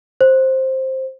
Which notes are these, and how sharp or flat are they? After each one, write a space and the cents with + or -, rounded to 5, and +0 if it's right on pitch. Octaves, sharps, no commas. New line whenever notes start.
C5 +10